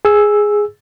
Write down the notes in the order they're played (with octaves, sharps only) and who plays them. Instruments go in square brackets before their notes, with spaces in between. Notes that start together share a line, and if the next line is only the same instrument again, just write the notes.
[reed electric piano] G#4 E6